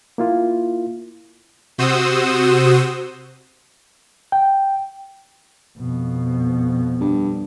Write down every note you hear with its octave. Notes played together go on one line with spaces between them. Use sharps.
A#3 E4 F4
C3 F#4 C5 D#6 E6
G5
F2 B2
G2